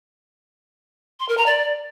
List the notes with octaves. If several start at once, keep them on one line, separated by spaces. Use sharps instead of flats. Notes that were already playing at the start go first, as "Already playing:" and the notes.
C6
A#4
A#5
D5